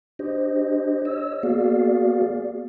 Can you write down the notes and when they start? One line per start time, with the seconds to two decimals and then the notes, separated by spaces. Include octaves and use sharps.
0.19 D4 G4 C5 D#5
1.05 C#5 D#5 E6
1.43 A#3 B3 F#4 G#4 D5 F5